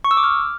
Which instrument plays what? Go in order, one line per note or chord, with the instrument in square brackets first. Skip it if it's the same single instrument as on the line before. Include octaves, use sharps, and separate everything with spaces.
[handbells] C#6
E6
D6
F6